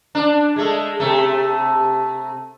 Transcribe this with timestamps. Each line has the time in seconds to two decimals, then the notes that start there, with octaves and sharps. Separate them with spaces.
0.15 D4
0.56 G#3 A3
1.00 C3 A3